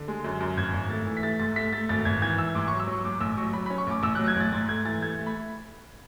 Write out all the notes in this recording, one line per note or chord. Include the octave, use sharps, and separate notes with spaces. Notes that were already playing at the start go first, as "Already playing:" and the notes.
Already playing: D3
G#3
F#2
F#2
G#1 G#6
G#1
A3 A6
E3
B6
A3 A6
G#2 A6
A3 B6
A3 A6
G#1 A6
G#1 G#6
E3 G#6
E3 E6
G#2 D6
C#6
F#3
E6
F#3 C#6
G#2 D6
A1 E6
F#3 C#6
F#3 B5
B5
C#4
C#6
A1 D6
A1 E6
F#6
F#3
G#6
A1 A6
G#2 A6
A3 G#6
E3 A6
A3 G#6
A3
B5